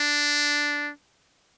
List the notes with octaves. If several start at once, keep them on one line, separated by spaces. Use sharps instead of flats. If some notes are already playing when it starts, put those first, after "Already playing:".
Already playing: D4